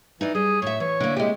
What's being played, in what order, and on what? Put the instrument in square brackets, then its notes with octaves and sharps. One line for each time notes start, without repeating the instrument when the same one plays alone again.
[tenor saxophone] E3 [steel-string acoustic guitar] D#4 D5 D#5
[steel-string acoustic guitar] G3 [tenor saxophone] G#4
[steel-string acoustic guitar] A2 E5 [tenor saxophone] C#5
[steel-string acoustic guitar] E3 [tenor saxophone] C#5
[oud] D3 [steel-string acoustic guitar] A#3 E4
[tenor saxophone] C3 [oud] G#3 G4